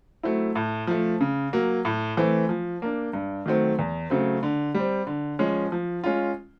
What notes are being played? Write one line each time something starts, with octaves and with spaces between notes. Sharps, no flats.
F#3 A3 C4 E4
A2
F3 A3
C#3
F#3 A#3
A2
E3 A3 C4
F3
A#3 D4
G2
D#3 F#3 A3 C4
E2
C#3 F#3 A3 C4
D3
G3
C4
D3
F3 G#3 C#4
F3
G#3 C#4 F4